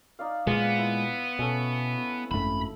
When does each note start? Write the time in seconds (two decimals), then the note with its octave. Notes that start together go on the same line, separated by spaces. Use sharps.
0.19 D#4 D5 F5
0.47 A#2 G#3 B3 C5 D5 F5
0.78 E4
1.39 B2 C#4 A4
2.31 G#1 F#2 A3 B5